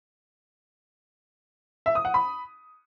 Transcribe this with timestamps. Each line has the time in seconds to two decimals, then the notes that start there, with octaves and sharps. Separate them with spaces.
1.86 E5
1.95 D#6
2.05 F#5
2.14 B5